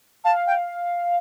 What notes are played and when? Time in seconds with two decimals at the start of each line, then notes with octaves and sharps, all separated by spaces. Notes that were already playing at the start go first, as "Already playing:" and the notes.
0.24 F5 A5
0.47 G5